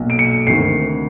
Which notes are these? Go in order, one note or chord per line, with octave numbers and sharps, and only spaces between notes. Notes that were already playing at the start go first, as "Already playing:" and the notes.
Already playing: B1 A#2
D7
C#7
D2 C3 D#3 C7